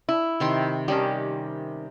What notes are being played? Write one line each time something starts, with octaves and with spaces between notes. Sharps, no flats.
E4
C3 D#3 C6
D#3 G3 C#4 G4